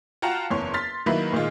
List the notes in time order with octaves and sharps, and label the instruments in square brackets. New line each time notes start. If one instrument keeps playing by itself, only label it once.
[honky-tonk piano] F4 F#4 F#5 G5 A5 A#5
F#1 E2 C#5 C6
C6 F6 A6 B6
D#3 F#3 A#3 E4 B4
A#2 D#3 G#3 F4